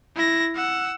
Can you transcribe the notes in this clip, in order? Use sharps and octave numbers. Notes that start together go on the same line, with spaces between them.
E4 A#6
F#5 E6